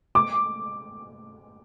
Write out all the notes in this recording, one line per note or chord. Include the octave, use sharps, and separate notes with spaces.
D6